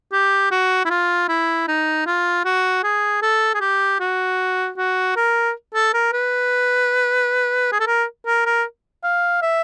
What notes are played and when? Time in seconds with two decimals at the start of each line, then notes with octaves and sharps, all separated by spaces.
0.12 G4
0.51 F#4
0.85 E4
0.90 F4
1.28 E4
1.67 D#4
2.06 F4
2.45 F#4
2.83 G#4
3.22 A4
3.54 G#4
3.61 G4
4.00 F#4
4.77 F#4
5.16 A#4
5.74 A4
5.94 A#4
6.13 B4
7.72 G#4
7.80 A4
7.87 A#4
8.26 A#4
8.46 A#4
9.03 F5
9.42 E5